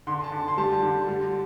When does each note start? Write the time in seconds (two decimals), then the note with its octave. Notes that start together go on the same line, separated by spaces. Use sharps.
0.07 D3 C6
0.24 A5
0.32 D3
0.48 C6
0.57 G3 A5
0.83 D3
1.08 G3